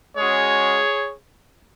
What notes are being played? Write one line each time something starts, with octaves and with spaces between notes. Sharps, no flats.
G#3 C#4 F#4 G#4 C#5